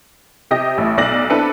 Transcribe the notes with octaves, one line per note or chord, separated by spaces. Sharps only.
C3 G4 D#5 A#6
A1 A2
B1 D5 A#6 F#7
C4 D4 E4 A4 B4